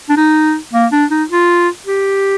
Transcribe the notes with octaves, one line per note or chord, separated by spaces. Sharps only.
D4
D#4
A#3
D4
D#4
F4
G4